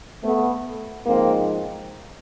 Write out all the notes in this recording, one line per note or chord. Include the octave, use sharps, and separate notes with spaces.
A3 B3
G#2 F3 A#3 C4